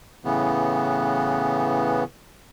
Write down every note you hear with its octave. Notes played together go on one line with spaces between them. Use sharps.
A2 C#3 E3 B3